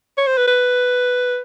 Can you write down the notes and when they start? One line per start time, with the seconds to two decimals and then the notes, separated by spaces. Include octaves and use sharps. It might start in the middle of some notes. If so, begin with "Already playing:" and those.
0.18 C#5
0.27 C5
0.37 B4
0.47 B4